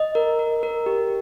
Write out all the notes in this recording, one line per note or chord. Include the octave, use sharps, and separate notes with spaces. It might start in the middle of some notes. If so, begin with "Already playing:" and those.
Already playing: D#5
A#4
A#4
A#4
G4